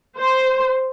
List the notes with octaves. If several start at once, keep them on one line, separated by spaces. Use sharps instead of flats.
C5